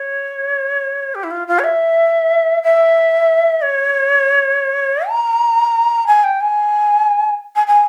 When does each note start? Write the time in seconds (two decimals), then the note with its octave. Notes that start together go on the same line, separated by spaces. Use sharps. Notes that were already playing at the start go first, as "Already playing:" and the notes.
Already playing: C#5
1.15 G4
1.23 E4
1.30 F4
1.47 F4
1.59 C#5
1.64 E5
2.63 E5
3.61 C#5
5.08 A#5
6.07 G#5
6.23 G5
6.41 G#5
7.56 G#5
7.67 G#5